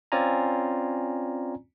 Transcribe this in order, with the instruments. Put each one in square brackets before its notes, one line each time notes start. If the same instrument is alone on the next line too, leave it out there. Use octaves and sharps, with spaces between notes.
[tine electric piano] C4 C#4 F4 D5 G#5 A#5